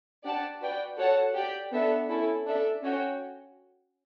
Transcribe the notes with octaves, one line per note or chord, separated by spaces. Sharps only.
D4 G4 D5 F#5 A5
F#4 B4 D5 G5
F#4 A4 C#5 F#5 A5
G4 D5 G5
B3 D4 A4 E5
C#4 E4 A4
D4 A4 E5
C#4 F#4 C#5 G5